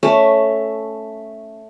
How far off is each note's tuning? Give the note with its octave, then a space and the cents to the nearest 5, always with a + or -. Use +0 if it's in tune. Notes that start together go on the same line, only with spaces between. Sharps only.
A3 +0 C#4 +0 D5 +20